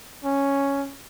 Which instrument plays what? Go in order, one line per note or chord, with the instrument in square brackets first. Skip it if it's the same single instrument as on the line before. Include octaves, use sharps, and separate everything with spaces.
[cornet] C#4